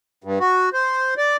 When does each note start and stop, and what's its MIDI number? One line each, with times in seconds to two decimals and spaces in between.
0.24 0.39 43
0.40 0.69 66
0.73 1.14 72
1.17 1.37 74